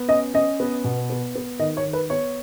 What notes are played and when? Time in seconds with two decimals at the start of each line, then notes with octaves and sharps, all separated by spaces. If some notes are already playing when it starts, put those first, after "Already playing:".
Already playing: B3
0.08 C#4 D#5
0.34 C#4 D#5
0.60 B3
0.84 B2
1.10 B3
1.35 B3
1.59 D#3 D#5
1.77 C#5
1.85 D#3
1.93 B4
2.10 B3 C#5